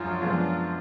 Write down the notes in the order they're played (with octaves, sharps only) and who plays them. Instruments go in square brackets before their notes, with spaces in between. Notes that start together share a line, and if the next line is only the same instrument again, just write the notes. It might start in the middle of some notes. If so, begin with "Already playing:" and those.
Already playing: [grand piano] F#2 F3 G#3 D4 [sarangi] F4
[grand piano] F#2 F3 G#3 B3 D4